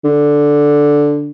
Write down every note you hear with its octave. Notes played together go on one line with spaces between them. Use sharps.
D3